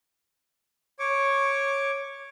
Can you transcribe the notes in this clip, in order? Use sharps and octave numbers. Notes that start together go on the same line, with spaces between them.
C#5 C#6 D6